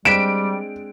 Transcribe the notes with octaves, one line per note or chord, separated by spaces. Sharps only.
G3 G#3 C4 D4 F#6 B6 D7 E7